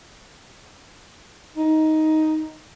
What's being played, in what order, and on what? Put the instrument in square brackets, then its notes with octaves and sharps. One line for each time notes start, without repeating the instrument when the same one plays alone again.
[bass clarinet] D#4